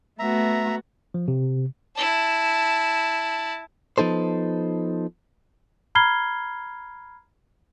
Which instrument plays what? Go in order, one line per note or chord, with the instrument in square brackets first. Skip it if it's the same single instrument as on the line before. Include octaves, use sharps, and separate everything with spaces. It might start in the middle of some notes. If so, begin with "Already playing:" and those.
[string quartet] A3 B3 F#4 [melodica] E5 A#5
[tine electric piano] F3
C3
[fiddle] E4 A5
[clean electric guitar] F3 B3 D#4 A4 C5
[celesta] A#5 B5 F6 G#6 C7 G7